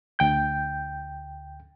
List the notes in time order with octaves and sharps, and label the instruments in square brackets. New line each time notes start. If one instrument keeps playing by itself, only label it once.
[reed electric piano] D2 G5 G6